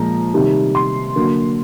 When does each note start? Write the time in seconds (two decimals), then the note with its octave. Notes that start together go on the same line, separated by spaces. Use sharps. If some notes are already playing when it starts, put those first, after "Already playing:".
Already playing: A#2 F3 G#3 A#5
0.34 C3 D#3 G3
0.75 C6
1.16 D3 F#3 A#3